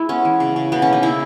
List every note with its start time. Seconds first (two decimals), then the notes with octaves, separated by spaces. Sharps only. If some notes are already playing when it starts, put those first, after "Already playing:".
Already playing: G#3 E4
0.09 B3 C#4
0.25 E3
0.40 C#3
0.56 C#3
0.72 B2 B3
0.82 A#3 C#4
0.93 D#4
1.03 C#3 E4